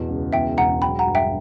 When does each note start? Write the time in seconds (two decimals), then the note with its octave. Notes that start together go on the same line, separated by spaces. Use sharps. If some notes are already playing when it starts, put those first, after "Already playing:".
Already playing: E2 B2
0.09 C#2
0.33 E2 E5 G5
0.58 E1 F#5 A#5
0.82 F#3 G5 B5
0.99 F#5 A#5
1.07 G2
1.15 E5 G5